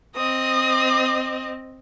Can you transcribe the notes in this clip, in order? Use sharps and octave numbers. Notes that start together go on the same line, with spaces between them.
C4 D#5 D#6